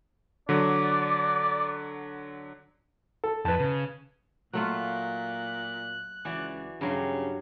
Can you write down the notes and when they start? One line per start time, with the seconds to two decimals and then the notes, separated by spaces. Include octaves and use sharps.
0.49 D3 F#3 D5
3.24 A4
3.45 F2 B4 A5
3.60 C#3
4.53 A#2 F#3 A3 F4 F#6
6.25 C#2 E3 F#4 D5
6.81 G2 C#3 F#3 C6